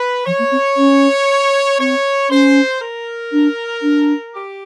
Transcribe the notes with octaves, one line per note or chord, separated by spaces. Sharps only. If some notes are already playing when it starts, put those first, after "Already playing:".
Already playing: B4
F3 C#5
A#3
C4
C#4
C4 C#5
C#4 C5
A#4
D4
D4
G4